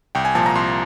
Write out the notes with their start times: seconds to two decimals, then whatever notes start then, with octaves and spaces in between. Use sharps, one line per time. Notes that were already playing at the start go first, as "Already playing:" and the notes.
0.15 C2 G5
0.25 G#5
0.35 A#2 F3 A5
0.46 A#5
0.55 C2 C6